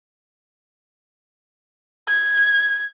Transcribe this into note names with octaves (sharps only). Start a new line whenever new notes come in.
G#6